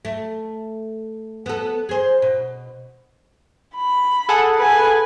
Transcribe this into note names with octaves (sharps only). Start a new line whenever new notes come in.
A3
B3 A4
G#4 C5
B2
B5
G#4 A4 F#5
B4 G#5